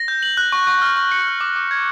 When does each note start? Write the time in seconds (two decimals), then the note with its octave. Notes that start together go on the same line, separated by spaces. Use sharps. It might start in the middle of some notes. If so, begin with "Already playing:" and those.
Already playing: A#6
0.08 G6
0.23 F#7
0.37 F#6
0.52 C#6
0.67 C#6
0.82 F6
0.97 C#6
1.12 C#7
1.27 F6
1.41 D6
1.56 D6
1.71 G#6